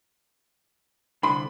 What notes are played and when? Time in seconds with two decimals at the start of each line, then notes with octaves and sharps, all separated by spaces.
1.23 C2 D3 B5 C6